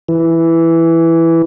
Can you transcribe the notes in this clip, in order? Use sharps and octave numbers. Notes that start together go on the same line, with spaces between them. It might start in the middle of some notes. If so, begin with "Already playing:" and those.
E3